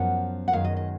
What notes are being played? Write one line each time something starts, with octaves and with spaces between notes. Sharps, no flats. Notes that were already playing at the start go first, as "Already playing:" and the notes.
Already playing: F#2 F3 B3 F#5
F#5
F#2 D#3 G#3 B3 F5
D#5
D#5